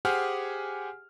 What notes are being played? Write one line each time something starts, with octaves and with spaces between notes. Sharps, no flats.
G4 G#4 C5 F#5 G#5 F6